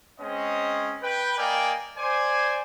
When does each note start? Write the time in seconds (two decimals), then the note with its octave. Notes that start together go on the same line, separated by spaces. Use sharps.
0.20 G#3 C4 C#4 C#5 D#5
1.02 B4 G5
1.38 A#3 A#4 D5 D#5 G5 G#5
1.98 C5 D5 G#5